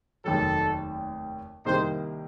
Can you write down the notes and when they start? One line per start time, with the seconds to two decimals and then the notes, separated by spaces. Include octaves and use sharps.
0.24 F1 D#2 D#3 F#3 A4
1.65 C2 C3 D#3 A#3 D#4 C5